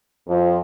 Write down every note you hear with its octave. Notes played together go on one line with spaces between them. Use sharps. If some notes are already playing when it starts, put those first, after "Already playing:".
F2 F3